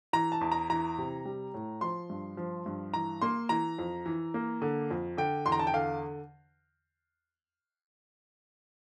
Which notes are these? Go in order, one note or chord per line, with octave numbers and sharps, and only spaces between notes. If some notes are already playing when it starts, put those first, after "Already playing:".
E3 A#5
A5
E2
A#5
E3 A#5
C3
G3
A2
F3 C6
G2
F3
G2
E3 A#5
A#3 C6
E3 A#5
F2
E3
A#3
D3
F2
D3 G5
E2 C6
A#5
A5
G5
D3 F5